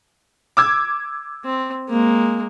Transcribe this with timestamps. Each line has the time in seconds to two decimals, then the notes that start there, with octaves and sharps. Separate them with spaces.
0.57 D6 E6 G#6
1.45 C4
1.89 G#3 A#3